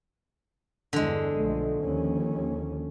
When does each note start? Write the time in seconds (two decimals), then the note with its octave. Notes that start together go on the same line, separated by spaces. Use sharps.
0.93 E2 G2 D3 G#3
1.37 B1 F3 A3
1.80 D#2 F3 C#4